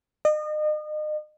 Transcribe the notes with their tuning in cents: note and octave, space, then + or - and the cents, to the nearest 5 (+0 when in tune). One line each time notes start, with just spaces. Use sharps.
D#5 -35